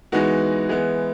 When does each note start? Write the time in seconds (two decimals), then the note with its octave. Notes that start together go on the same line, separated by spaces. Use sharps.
0.12 E3 G#3 B3 D#4 F#4
0.69 E3 G#3 B3